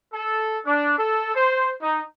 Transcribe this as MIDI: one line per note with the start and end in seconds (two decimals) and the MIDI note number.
0.13 0.59 69
0.66 0.96 62
0.97 1.32 69
1.35 1.72 72
1.81 2.01 63